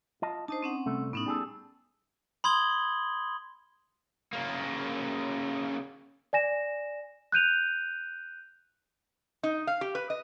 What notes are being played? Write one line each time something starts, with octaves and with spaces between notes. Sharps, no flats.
F4 D#5 A5
D4 D#4 C5 D#5 A5
C4 C#4 F#5
C2 A3
A2 B3 C#4 D#4
G3 G#4 A4
B5 C6 D#6 G#6 F#7 G7
C#3 A#3
D5 G#5 A#6 E7
F#6 G6 D#7 F7
D#4
F5
G4
B4
D#5